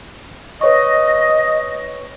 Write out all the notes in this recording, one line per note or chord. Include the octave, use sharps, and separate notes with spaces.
B4 C#5 D#5 C#6